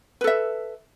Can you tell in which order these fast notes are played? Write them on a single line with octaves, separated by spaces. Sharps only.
B4 A4 E5